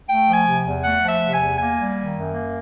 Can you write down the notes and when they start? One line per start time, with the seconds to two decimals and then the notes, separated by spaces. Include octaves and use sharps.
0.09 A3 G5
0.28 F3
0.34 G#5
0.46 C3
0.65 E2
0.84 A3 F#5
1.02 F3
1.09 E5
1.21 C3
1.34 G#5
1.41 E2
1.59 A#3 G#5
1.77 G3
1.96 D#3
2.15 F#2
2.33 A#3